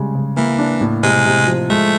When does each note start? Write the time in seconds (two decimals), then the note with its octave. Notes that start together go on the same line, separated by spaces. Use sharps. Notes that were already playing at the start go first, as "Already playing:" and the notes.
Already playing: C#3 G3 G#3
0.15 C#3
0.37 E3 A#3
0.59 D4
0.81 A2
1.03 C3 G#3
1.26 C3
1.48 F3
1.70 G#3 A3